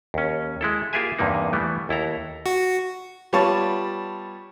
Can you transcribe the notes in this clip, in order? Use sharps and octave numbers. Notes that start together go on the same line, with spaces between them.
D#2 C#4
G#3 E4 A4
A#3 F4 G4 G#4 E5 G#5
E2 G2 C3 A#3 D#4
E3 G3 A3 B3
D#2 E4 A4 A#5
F#4
G3 B3 F4 C#5 A5